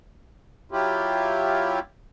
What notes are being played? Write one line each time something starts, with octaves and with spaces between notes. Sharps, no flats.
F#3 E4 F4 G4